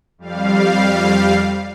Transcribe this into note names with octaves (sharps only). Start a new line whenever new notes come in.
F2 G3 F5